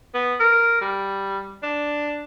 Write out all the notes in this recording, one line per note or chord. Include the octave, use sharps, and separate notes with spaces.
B3
A#4
G3
D4